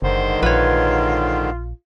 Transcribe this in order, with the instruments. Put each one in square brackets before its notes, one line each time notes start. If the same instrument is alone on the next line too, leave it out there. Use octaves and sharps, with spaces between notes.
[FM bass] F#1 [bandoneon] G#2 D3 D#3 [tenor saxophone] C5
[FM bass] A#1 [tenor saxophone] F4 [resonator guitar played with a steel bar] B4 C#5